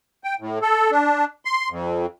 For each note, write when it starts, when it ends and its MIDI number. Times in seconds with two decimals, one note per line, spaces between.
0.24 0.35 79
0.40 0.59 45
0.62 0.91 69
0.91 1.25 62
1.45 1.69 84
1.70 2.06 41